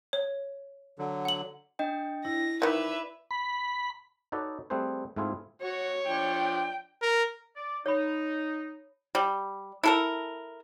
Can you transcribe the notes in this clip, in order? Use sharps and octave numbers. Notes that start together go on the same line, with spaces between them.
C#5
D3 F#3
F#5 F#7
D4 D#5 G5
E4 A#6
D#3 E3 B4 D5 E5 B5
B5
D#4 F#4 A4 B4 C#5 D5
G3 A3 C4 G#4 B4 C5
G#2 A3 C4 E4 F4 G#4
F#4 C#5
F3 D4 G5
A#4
D5
D#4 C#5 B5
G3
E4 A4 A#4